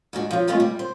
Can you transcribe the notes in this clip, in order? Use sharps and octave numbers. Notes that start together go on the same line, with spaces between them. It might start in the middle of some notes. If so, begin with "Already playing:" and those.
G#2 D4 F#4
F3 F#3
G#3 A3 B3 C4 F4 G#4
G3
C5